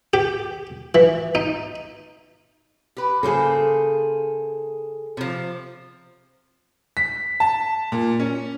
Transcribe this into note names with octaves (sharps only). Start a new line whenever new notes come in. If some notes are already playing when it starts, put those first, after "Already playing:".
G4
E3
D#4
G4 B4
C#3 A#3 G#4 A4 C5
C3 F3
B6
A5
A#2
C#4